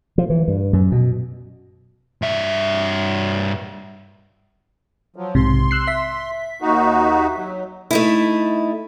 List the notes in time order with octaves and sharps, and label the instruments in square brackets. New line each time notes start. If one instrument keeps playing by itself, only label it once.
[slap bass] F3
E3
G2
F#2
B2
[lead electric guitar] G2 E5
[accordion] F3 F#3
[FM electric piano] B1 G#2 C3 [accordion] C6
[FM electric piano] E6 F#6 C7
E5 B6
[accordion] D#2 D#4 F#4
F#3
[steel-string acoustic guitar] A3 D#4 E4